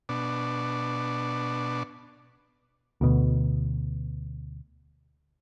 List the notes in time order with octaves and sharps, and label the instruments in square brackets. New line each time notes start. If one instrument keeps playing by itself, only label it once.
[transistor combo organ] B2 D4
[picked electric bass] D2 B2